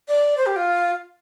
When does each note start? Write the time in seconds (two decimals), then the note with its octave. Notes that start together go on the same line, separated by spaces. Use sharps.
0.08 D5
0.37 C5
0.46 G4
0.56 F4